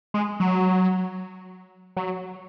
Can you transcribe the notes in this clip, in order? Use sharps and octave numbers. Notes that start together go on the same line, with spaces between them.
G#3
F#3
F#3